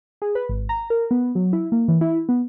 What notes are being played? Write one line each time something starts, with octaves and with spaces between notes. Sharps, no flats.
G#4
B4
G#1
A#5
A#4
B3
F#3
E4
A#3
E3
E4
B3